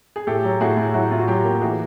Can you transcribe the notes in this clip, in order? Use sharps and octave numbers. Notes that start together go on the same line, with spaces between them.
G#4
A2 G4 A4
F#3
A2 F#4 G#4
A2
F#3 E4 F#4
A2 F4
F#4
F#3 F4 G4
A#3
E3 F#4 G#4